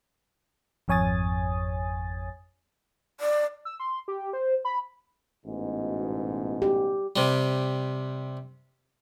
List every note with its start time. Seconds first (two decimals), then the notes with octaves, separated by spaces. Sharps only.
0.88 G#1 F2 C#5 G#5 D#6 A6
3.20 D5
3.65 E6
3.80 C6
4.08 G4
4.33 C5
4.65 B5
5.45 A1 G#2 B2
6.62 G4
7.16 C3 G3